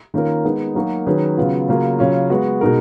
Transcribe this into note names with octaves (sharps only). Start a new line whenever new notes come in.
D#3 A#3 C#4 F4 A#4
G#3 B3 D#4
F#3 A#3 D#4 F#4 A#4
D#3 F#3 C#4 G#4 B4
C#3 F#3 B3 F4
C#3 F#3 A#3 C#4 F4
C#3 F#3 C#4 F4
G#3 B3 F#4
B2 G#3 D#4 A#4